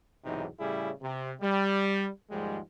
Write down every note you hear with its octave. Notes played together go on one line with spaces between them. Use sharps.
B1 E2 G#2 C3 E3 D#4
A2 C#3 G3 E4 G#4
C3
G3
D#2 G#2 F3 G3 G#3